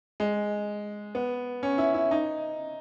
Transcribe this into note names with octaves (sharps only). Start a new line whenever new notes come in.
G#3
B3
C#4
E4
E4
D#4